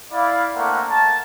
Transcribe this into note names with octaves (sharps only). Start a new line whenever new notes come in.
E4 D5 F5
A3 A#3 C4 D4 A#4 F#5
A5